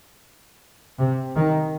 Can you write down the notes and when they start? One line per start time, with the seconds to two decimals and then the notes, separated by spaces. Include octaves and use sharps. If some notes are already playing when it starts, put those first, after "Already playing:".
0.99 C3
1.35 D#3